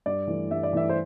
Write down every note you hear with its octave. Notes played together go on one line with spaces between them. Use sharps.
G2 D5
E3 A3
G2 E5
D5
E3 A3 E5
C5